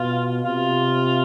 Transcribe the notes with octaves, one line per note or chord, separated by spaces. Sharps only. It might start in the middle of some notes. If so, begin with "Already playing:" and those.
Already playing: B2 F4
C3 F4